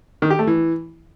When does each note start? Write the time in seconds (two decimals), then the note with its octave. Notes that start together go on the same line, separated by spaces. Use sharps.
0.22 D#3
0.30 G4
0.39 A3
0.47 E3